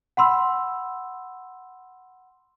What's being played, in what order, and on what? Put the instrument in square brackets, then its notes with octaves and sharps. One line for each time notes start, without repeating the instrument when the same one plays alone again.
[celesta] F#5 B5 C6 E6